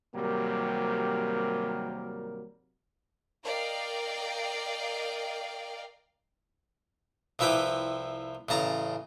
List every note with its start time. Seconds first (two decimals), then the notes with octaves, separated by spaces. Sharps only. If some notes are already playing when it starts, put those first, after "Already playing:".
0.15 G#1 C3 F#3 G3 A#3 A#4
3.44 A#4 D5 D#5 F5 G5
7.39 C2 F3 E4 B4 G5 D6
8.49 A1 C#3 A5 A#5